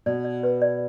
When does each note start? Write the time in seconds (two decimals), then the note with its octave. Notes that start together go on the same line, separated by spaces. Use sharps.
0.06 B2 D5
0.25 D5
0.43 B4
0.62 D5